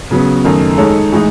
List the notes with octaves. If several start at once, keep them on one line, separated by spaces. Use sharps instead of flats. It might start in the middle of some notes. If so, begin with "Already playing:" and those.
C#3 F#3 B3
F#2 D#3 A3 D#4
G#3 D#4 A4 C#5
A2 E3 G#3 D#4